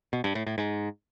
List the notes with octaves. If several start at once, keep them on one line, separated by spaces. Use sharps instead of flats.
B2
G2
A2
A2
G#2